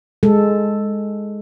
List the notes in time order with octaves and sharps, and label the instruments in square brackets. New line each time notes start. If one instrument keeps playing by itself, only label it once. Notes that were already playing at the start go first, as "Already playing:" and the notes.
[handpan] G#3 A4